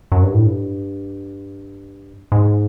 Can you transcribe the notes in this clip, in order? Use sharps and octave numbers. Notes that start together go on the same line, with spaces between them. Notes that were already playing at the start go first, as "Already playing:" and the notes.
F#2
G2
A2
G2
G#2